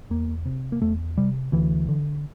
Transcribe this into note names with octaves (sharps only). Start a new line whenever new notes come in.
E2 A#3
C3
A#3
E2 A3
C3 G3
D2 E3
D3